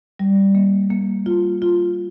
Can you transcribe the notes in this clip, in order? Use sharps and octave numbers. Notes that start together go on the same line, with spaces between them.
G3
A#3
A#3
F4
F4